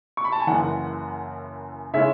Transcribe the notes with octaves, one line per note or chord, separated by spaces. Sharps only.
C#6
B5
A5
G#5
F#1 F#2 C#3 E3 F#5
C#3 G#3 C#4 E4 E5